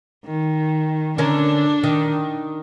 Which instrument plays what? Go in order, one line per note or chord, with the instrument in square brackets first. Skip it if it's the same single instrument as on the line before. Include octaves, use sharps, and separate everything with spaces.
[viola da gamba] D#3
[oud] D3 C#4 A#4 [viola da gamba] D4
[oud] D#3